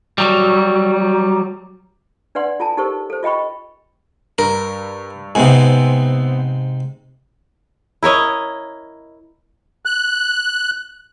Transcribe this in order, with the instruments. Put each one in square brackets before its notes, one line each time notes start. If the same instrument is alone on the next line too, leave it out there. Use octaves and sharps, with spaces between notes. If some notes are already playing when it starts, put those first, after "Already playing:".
[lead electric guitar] F#3 G3
[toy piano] D4 B4 D5 F#5 C6
F4 A4 G#5 A5
D#4 G4 A4 A#4 C5 C#6
A4 C5
F4 D#5 G5 B5 C#6
[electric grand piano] G2 [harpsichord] A#4
[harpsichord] G#2 C3 [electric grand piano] B3 C4 G#5
[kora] E4 A#4 C#5 D#5
[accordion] F#6